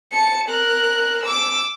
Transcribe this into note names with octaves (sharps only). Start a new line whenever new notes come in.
A5 C#7
A#4 F#6
D6 E6